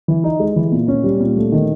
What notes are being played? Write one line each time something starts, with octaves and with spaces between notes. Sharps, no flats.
E3
D#4
G#3
E3
A#2
C#4
G3
A#2
A3
D#3